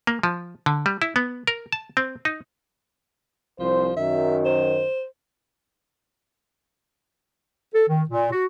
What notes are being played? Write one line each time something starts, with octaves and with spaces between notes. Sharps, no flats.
A#3
F3
D3
G3
E4
B3
A#4
A5
C4
D#4
C2 F3 C5
F#2 D#3 F#3 E5
C5
A4
D#3
A#2
F#4